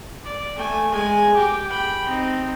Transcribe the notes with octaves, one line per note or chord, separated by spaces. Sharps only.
D5
A3 G#5
G#3 G#5
G4 D6
G5 B5
C4 D#4